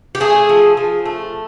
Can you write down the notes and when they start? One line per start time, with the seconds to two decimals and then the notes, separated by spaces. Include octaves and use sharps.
0.15 G4
0.20 A3 G#4
0.49 F3
0.77 F3
1.06 A3